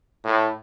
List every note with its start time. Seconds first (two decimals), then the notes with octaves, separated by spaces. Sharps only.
0.24 A2